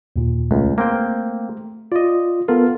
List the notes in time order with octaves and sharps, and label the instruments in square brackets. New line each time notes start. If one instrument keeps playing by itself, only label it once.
[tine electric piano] D#2 A#2
[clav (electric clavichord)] C#2 [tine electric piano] A3
[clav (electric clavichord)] A#3 C4 G5
[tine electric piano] F4 [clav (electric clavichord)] D5 D#5
[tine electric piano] B3 A4 A#4 [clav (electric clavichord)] F4